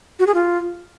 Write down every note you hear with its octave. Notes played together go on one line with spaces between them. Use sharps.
F#4
G#4
F4